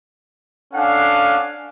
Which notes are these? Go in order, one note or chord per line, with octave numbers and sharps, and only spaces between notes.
C#4 D4 A4 F5 F#5 G#5